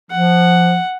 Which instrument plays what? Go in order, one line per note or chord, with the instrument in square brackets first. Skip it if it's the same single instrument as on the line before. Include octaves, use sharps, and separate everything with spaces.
[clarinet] F3 [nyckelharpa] F#5